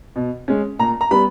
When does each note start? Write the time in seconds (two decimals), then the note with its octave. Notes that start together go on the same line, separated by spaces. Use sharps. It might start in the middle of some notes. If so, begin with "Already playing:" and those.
0.16 B2
0.48 G#3 C#4
0.79 A#2 A#5
1.01 A#5
1.11 G3 B3 B5